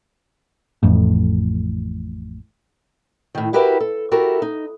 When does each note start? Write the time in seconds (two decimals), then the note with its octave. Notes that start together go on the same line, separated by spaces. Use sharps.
0.83 A1 F2 A2
3.35 A2 D#3
3.53 E4 F#4 G4 A#4 B4 E5
3.80 A4
4.11 E4 F#4 G4 A4 A#4
4.42 D#4